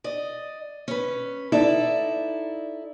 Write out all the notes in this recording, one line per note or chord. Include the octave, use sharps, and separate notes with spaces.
D5 D#5
C#4 B4
D#4 E4 A4 D5